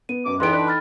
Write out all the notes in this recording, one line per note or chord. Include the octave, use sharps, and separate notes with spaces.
B3 D#7
F#2 B2 D6
E2 E3 B3 D#4 A4 G5 C6 D7
D4 B4
B5 F6 A6